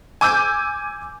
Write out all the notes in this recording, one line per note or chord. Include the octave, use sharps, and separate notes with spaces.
G#5 D6 E6 G6